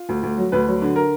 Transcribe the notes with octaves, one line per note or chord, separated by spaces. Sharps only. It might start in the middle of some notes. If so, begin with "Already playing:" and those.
Already playing: F4
D2
D2
F#3
D2 B4
F#3
D3
A#4